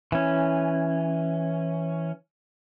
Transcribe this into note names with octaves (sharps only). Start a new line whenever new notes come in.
E3 C#4